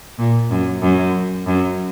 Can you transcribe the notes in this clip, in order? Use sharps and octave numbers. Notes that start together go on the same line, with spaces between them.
A#2
F#2
F#2
F#2